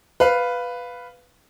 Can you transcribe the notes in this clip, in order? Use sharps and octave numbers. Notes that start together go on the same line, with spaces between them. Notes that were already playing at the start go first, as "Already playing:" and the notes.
B4 F5